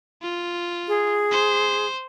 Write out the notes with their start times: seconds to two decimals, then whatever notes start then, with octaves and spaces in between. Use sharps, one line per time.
0.22 F4
0.88 G#4
1.31 C5